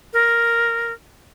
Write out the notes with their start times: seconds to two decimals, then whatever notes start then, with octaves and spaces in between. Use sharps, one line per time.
0.13 A#4